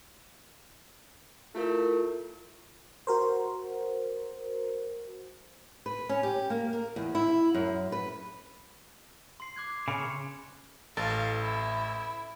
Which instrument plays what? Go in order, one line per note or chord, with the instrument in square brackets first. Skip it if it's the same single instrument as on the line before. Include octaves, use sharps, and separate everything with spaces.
[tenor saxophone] A3 [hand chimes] E4 F4 A#4
[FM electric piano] F#4 A#4 C5
[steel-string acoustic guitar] B4
C#4
G4
A#3
A#4
E2
E4
F#2
B4
[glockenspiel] C6 C7
D6 F#6 G#6
[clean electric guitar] C#3 [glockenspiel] B5 C#7
[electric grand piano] A1 A4 A6 [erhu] F5
[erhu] E4